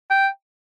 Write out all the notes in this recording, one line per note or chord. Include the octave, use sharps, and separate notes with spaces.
G5